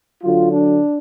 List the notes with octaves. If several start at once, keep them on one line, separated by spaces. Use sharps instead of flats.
D3 F#3 F4
D4